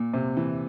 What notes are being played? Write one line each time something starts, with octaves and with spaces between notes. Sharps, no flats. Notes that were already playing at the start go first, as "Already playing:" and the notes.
Already playing: A#2
C3
E3